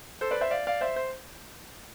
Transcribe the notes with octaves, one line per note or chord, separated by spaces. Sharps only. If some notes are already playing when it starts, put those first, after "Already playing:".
A4 C5
B4 D5
C5 E5
D5 F5
D5 F5
C5 E5
C5